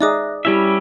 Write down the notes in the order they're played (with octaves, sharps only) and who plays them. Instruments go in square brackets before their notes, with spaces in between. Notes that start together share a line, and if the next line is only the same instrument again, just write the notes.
[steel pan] D#4 G#4 [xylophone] D5 D6 D#6 [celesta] E5 F#6 A#6
[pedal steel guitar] G3 C#4 E5 [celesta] E4 G4 B5